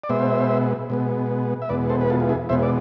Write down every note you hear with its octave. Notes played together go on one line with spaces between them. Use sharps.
D5
B2 G#3 B3 C5 E5
B2 G#3 B3
E5
E2 B2 G#3 B3 B4 D5
A4 C5
B4
F4 A4
F4
E4 G#4
E2 B2 G#3 B3 C5 E5
D5